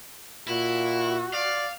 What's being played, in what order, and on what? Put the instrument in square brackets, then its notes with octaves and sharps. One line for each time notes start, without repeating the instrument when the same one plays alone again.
[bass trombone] A#2 [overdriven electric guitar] E4 [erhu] F#4
[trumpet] D5 [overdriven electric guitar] F5